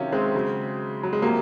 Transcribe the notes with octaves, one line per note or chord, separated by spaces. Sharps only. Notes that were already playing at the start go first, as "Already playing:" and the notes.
Already playing: C3 D#3 F#3 C#4 F4
G#3 C4
C#3 F#3
F#3
G#3
C3 F3 F#3 A#3